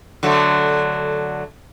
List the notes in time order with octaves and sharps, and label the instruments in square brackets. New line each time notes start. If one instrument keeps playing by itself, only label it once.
[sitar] D3 F#3 A3